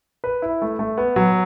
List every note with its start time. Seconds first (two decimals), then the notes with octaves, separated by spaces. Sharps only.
0.24 B4
0.42 E4
0.62 A3
0.79 A3
0.98 B3
1.16 F#3